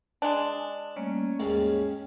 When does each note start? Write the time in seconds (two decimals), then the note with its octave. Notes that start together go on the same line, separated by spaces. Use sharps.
0.22 G#3 D4
0.96 G3 A3 A#3 C#4
1.40 D#2 G#2 G5